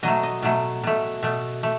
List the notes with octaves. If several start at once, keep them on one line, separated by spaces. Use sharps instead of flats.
B2 F#3 A3 D#5
D#5
B2 F#3 A3
B2 A3
B2 A3
A3